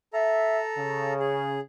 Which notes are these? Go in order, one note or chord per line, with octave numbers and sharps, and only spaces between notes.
A4 E5 A#5
C#3
G#4